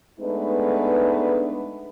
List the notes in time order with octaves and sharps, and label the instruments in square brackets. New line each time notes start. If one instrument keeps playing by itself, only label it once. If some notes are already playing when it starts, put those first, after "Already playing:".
[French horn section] G#3 A3 B3 D4 D#4 B4